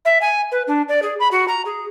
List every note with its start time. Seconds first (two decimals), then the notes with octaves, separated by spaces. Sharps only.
0.05 E5
0.21 G#5
0.52 B4
0.67 D4
0.89 D5
1.02 G#4
1.20 B5
1.31 F#4
1.48 A#5
1.65 G#4